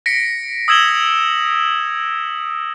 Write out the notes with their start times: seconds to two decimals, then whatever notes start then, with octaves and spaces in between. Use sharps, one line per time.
0.06 A#6 B6 C#7 D7
0.68 D#6 E6 G#6 E7 F#7 G7